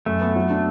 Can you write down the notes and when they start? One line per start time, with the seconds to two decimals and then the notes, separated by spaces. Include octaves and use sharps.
0.06 F#2 A3
0.21 B3
0.36 F#3
0.50 D4